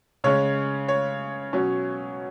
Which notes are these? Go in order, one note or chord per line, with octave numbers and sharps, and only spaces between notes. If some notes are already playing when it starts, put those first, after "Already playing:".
C#3 G#3 C#4 C#5
C#5
B2 F#3 C#4